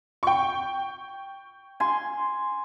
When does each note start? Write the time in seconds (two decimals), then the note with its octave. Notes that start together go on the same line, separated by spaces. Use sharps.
0.23 G5 C#6
1.80 G#5 C6